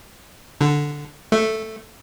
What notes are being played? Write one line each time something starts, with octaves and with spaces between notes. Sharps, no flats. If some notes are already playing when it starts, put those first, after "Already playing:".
D3
A3